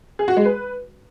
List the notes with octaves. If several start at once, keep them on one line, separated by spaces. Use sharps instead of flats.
G#4
F#4
G#3
B4